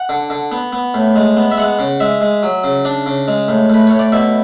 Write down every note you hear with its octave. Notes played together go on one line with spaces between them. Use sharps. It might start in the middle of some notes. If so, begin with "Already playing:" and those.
Already playing: F#5
D3
D3
B3
B3
A2
G#3
B3
E5
G#3 F#5
C#3
G#3 E5
G#3
F#3
C#3
D4
C#3
G#3
A2
A2 B4
A2 C#5
D5
B2 E5